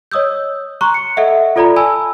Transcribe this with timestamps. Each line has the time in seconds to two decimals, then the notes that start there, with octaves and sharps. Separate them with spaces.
0.12 C#5 D#5 D#6 E6 G6
0.81 A#5 C6 C#6 F#6
0.94 C#7
1.17 A4 D#5 E5 F#5
1.56 F4 A4 D5 A#5 B5
1.76 G#5 A5 B5 E6